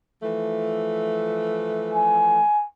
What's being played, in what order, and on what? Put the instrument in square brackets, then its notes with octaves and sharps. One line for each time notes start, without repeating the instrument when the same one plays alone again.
[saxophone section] E3 F3 A3
[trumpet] G#5